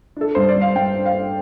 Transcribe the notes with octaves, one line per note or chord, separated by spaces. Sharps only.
D4 A4
G2 C5
D5
G2
F5
G2 G5
D4
F5
D4